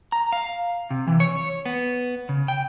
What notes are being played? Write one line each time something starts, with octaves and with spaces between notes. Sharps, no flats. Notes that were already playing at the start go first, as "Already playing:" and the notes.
A#5
F5
C3
E3
C#5
B3
C#3
G5